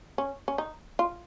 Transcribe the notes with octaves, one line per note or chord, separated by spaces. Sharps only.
C#4
C#4
D#4
F4